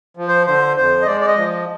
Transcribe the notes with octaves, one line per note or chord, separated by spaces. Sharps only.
F3
C5
D3 C5
F2 C5
D#5
G#3 D5
D5
D#5
F3